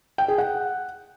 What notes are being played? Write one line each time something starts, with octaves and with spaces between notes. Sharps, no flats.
G5
G#4
F#5